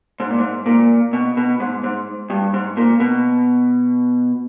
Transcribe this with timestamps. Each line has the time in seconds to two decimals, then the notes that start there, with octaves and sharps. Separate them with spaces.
0.20 G#2
0.29 A#2
0.39 G#2
0.66 A#2
1.13 B2
1.37 B2
1.60 G#2
1.84 G#2
2.30 G2
2.54 G#2
2.77 A#2
3.00 B2